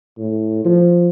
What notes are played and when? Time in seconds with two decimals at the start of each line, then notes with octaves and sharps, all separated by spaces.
0.18 A2
0.65 F3